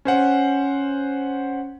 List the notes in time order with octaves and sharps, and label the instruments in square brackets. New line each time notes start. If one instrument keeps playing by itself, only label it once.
[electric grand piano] C#4 C5 F#5